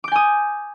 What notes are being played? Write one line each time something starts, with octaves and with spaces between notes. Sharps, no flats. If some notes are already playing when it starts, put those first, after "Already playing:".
G#5 D6 D#6 G6